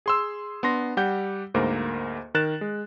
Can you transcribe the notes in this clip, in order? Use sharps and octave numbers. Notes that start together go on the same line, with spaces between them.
G#4 C6 E6
B3 D4 C6 A#6
G3 G4 F#5 G6
D2 G#2 A#3 A#4 C5
D#3 A#4 F#6 A6 E7
G#3